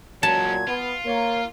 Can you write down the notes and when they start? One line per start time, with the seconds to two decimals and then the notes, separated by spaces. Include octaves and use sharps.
0.23 A#2 F#3 G#3 C#4 A5 G#6
0.67 B3 F4
1.06 A#3 C#5